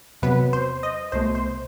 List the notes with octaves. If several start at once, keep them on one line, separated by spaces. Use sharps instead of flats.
E2 C3 F#3 B3 B4
C5
D#5
C2 B2 A3 C5
C5